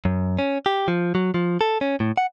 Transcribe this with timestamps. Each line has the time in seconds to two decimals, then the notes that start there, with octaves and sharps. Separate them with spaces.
0.05 F#2
0.39 C#4
0.66 G4
0.88 F3
1.15 F#3
1.34 F3
1.61 A4
1.81 C#4
2.00 A2
2.17 F#5